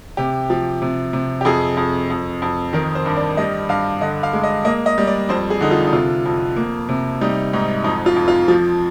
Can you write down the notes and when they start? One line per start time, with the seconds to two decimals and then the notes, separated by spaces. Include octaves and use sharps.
0.17 C3 G4
0.50 F3
0.82 C3
1.13 C3
1.41 G4
1.45 F2 G#4
1.77 F2
2.10 F2
2.42 F2
2.73 D#3 A#4
2.95 C5
3.06 G2
3.17 D5
3.37 G3 D#5
3.69 G2 F5
4.01 D3 D#5
4.23 F5
4.33 G#3
4.43 D#5
4.65 A#3 D#5
4.86 D#5
4.98 G3
5.07 D5
5.29 F2 C5
5.50 G#4
5.61 D3 D#4
5.71 F4
5.87 D#4
5.92 C3 F4
6.26 F2
6.56 A#3
6.89 C3
7.21 G3 D#4
7.53 G#2 D#4
7.84 F2 D#4
8.06 F4
8.16 F2
8.28 F4
8.48 F3